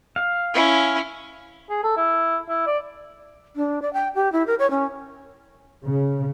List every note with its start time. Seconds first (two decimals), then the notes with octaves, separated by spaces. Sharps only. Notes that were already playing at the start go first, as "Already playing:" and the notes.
0.16 F5
0.54 C#4 E4
1.70 G#4
1.83 A4
1.97 E4
2.49 E4
2.67 D5
3.56 D4
3.82 D5
3.93 G5
4.15 G4
4.32 E4
4.47 A#4
4.59 C#5
4.71 C#4
5.86 C#3